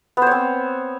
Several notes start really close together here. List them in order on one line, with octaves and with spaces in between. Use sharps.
B3 C5 C#5 C4